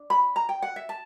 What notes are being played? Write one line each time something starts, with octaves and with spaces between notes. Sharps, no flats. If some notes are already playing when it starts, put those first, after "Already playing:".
Already playing: D4
B5
A#5
G5
F#5
E5
A5